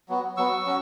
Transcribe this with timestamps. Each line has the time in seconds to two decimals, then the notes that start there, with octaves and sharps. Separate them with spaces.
0.09 F#3 B3 F#4
0.37 F#3 B3 F#4 C#6 E6
0.66 F#3 C#4 F#4